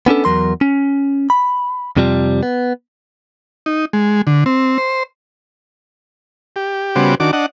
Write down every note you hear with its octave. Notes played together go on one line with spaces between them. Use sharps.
B3 C#4 D4 A4
E2 F#3 A#4 C6
C#4
B5
F2 C3 F3 G3
B3
D#4
G#3
D3
C4
C5
G4
C#3 G3 B3 F#4 C5 D6
D#3 D4 F#4 D6
D4 D#5 F#5